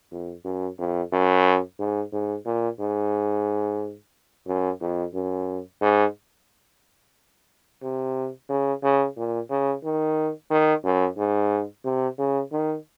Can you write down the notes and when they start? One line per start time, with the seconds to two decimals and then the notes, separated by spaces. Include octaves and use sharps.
0.11 F2
0.45 F#2
0.79 F2
1.12 F#2
1.79 G#2
2.13 G#2
2.46 A#2
2.80 G#2
4.47 F#2
4.81 F2
5.14 F#2
5.81 G#2
7.83 C3
8.50 C#3
8.83 C#3
9.16 A#2
9.50 C#3
9.84 D#3
10.51 D#3
10.84 F#2
11.17 G#2
11.85 C3
12.18 C#3
12.52 D#3